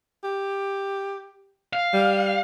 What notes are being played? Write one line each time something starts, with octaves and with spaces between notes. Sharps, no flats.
G4
F5
G3